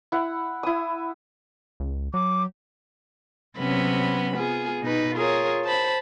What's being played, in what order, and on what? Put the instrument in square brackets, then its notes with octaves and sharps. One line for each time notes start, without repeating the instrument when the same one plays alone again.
[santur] E4 F#5
E4 D#6
[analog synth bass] C#2
[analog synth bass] F#3 [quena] D6
[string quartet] C3 F#3 B3 C#4 B5
B3 F4 G#4
B2 D#4 B4
F4 G#4 A#4 C#5
C5 A5 B5